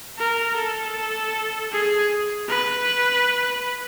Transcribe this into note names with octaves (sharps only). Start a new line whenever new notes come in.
A#4
A4
G#4
B4